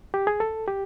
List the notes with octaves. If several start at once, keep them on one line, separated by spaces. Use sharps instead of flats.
G4
G#4
A4
G4